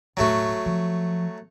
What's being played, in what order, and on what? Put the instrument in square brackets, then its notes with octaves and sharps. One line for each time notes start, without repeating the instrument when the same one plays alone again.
[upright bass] E1 A2 [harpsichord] F#3 A3 F#4
[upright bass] F3